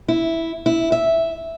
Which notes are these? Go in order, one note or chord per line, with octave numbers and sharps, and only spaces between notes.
E4
E4
E5